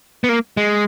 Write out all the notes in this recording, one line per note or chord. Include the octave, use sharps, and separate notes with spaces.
B3
A#3
G#3